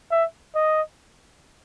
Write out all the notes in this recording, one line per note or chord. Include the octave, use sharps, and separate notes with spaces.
E5
D#5